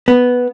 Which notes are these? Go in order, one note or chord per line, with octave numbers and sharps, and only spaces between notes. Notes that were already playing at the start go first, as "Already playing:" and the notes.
B3